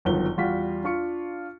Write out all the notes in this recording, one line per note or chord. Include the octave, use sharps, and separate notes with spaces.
G1 F#2 D#3 F3 B3 G7
E2 G3 F4 F#4 B6
D4 F4 C#6 C#7